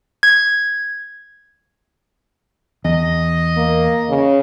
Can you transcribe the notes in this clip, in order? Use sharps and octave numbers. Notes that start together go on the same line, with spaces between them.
G#6
E2 D#5
A#3
C#3